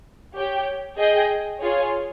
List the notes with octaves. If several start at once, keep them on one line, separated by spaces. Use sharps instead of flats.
G4 C#5 G5
G#4 D#5 G5
F4 G#4 C#5